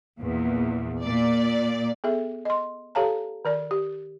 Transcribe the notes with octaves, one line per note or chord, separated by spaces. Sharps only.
A#1 E2 A#2
A#2 D5
B3 G#4 A4 E5
D#5 C6
G4 A4 C#5 F5 A5 A#5
D#3 A#4 D5
G4